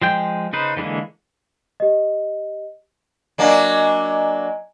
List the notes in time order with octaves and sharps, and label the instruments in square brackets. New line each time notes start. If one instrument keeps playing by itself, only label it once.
[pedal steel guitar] F3 G#3 G5
C#3 D#4 B4 C5
D3 E3 G#3 A#3
[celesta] G4 D#5
[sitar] F#3 A#3 D4 [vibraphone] D#5 G#5 A#5